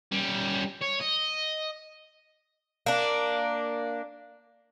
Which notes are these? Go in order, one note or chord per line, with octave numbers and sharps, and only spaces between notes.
G3 C#4
C#5
D#5
A#3 D4